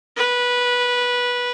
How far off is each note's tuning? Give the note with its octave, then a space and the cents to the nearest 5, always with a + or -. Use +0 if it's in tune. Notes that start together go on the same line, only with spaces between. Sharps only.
B4 -15